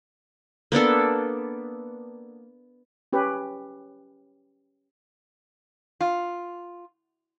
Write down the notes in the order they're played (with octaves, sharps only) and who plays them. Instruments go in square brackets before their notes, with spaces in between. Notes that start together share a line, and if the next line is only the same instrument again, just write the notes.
[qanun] A#3 B3 D4 A4
[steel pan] C#4 G4 B4
[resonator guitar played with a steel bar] F4